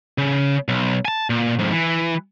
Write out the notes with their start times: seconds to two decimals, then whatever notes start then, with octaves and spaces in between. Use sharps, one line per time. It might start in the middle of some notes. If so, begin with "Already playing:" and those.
0.18 C#3
0.68 B1
1.05 G#5 A5
1.30 A#2
1.59 F2 G#2
1.72 E3